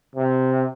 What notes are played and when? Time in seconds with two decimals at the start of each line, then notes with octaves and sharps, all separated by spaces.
0.16 C3